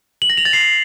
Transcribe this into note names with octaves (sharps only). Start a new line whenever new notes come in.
F#7
A#6
F7
A6
C7